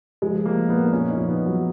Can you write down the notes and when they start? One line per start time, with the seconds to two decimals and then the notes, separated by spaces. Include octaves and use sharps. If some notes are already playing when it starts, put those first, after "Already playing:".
0.22 F3 G#3
0.46 F3 A#3
0.69 A#2 B3
0.87 B3
0.93 F3 C#4
1.10 D#4
1.17 F3
1.28 B3
1.40 A#2
1.46 F#3